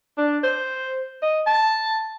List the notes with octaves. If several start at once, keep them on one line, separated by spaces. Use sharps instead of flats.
D4
C5
D#5
A5